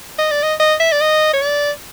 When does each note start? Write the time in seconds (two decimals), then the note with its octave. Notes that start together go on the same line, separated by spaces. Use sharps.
0.19 D#5
0.31 D5
0.43 D#5
0.60 D#5
0.80 E5
0.92 D5
1.01 D#5
1.33 C#5
1.42 D5